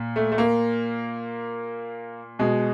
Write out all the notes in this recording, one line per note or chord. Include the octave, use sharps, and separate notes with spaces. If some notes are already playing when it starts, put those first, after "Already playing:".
Already playing: A#2
A3
A3
A#3
B2 G#3